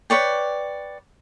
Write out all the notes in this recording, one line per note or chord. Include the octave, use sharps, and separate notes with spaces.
B4 C#5 D5 G5